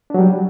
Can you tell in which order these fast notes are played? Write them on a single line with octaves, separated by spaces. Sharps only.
D4 F#3 G3